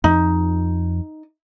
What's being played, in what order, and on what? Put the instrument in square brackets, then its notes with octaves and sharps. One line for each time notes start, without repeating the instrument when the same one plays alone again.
[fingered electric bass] F2 F3 [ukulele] D#4